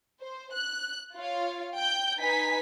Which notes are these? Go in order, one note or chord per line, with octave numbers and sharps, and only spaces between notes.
C5
F#6
F4 C#5 F5
G5 G6
D#4 B4 G#5 B6